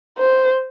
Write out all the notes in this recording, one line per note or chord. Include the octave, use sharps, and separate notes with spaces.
C5